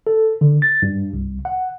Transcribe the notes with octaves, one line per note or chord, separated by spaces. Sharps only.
A4
D3
A6
G2
C2
F#5